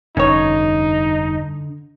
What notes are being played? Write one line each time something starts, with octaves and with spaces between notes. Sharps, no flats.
F1 G2 D3 C#4 D#4 C#5